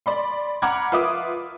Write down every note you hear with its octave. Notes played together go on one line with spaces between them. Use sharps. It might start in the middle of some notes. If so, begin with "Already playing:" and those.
D5 B5 C6
F#5 A#5 B5 D6 F6 G#6
F4 B4 E5 D6 D#6